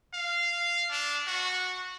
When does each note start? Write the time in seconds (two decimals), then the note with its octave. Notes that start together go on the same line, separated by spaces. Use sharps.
0.14 F5
0.91 D4
1.27 F#4